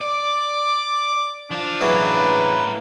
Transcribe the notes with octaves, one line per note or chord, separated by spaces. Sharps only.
D5 D6
F3 D4 F4
A2 C#3 E3 F#3 A#3 B4